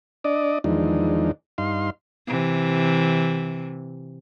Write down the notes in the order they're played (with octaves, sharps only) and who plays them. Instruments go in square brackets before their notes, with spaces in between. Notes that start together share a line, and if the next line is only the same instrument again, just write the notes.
[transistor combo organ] D4 D5 D#5
E2 D#3 F3 G#3 D4 D#4
G2 D#4 F5 C6
[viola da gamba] C3 E3